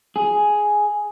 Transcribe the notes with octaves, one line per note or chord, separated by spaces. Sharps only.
G#4